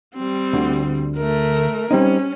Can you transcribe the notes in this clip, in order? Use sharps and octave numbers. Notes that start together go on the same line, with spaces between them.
G3 C4
D2 D3
A3 A#4
G3 C4 C#4 D#4